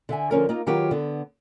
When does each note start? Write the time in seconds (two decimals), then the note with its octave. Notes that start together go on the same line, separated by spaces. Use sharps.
0.09 D3 E5 G#5
0.31 D3 F3 C#4 A#4
0.49 A#3 D#4 F4
0.66 D#3 F#3 F4 G4 B4 C#5
0.91 D3 B3